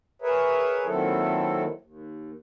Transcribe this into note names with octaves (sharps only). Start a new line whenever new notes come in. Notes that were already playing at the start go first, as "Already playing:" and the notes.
G#4 A#4 B4 C#5 E5
A#2 D#3 F#3 C4 E4 A4
D#2